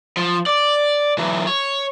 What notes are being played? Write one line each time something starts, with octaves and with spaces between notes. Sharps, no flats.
F3
D5
E3 F#3
C#5